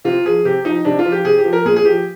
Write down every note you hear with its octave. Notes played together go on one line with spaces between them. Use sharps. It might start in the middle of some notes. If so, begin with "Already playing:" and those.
C3 F4
F3 G#4
C3 G4
F3 D#4
C3 D4
F4
F3
G4
C3 G#4
G4
F3
A#4
A#2 G#4
G#4
F3 G4